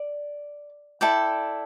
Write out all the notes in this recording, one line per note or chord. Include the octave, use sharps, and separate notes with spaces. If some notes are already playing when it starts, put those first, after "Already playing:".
Already playing: D5
E4 A4 D5 G5